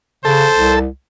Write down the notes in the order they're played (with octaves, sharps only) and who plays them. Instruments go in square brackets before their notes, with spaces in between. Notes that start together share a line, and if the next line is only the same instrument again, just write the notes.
[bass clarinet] C#3 [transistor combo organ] A4 [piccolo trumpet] C5
[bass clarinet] C2